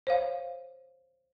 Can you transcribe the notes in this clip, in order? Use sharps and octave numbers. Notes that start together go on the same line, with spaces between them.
C5 C#5 F5